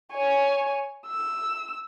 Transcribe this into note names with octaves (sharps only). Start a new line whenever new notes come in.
C#5 G#5
E6